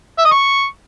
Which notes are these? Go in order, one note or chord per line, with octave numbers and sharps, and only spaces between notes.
E5
D#5
C#6